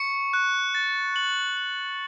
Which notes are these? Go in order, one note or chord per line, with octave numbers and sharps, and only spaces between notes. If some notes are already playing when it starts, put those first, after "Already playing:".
Already playing: C#6 C#7
F#6
A6
F#7
F#7